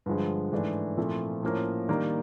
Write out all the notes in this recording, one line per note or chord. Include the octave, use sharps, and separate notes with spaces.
G2 D3 F3 G#3
G#2 E3 A3 D4
A#2 F3 A3 C4 E4
A2 F3 A#3 C#4
D#3 G3 A#3 D4